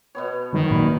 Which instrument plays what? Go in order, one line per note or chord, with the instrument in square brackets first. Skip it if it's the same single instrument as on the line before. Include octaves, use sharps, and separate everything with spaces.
[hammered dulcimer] B2 B3 C#5
[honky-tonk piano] F#2 [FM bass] D#3
[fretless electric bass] A#2 [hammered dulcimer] B5